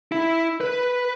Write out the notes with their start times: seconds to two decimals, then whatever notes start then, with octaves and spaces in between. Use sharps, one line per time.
0.12 E4
0.61 B4